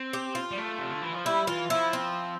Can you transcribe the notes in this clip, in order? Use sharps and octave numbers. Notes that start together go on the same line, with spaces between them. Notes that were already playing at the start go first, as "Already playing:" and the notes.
Already playing: C4
G4
F4
G3
A3
C3
D3
E3
F3
G3 E4
E3 F4
F3 E4
C4